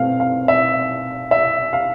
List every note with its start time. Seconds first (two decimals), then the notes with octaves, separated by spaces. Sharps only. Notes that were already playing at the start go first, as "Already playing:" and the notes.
Already playing: B2 A3 C4 F5
0.20 F5
0.48 E5
1.31 E5
1.73 F5